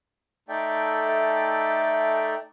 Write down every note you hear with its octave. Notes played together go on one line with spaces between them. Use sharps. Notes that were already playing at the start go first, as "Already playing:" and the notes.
A3 D#4 A4 D5 E5 G5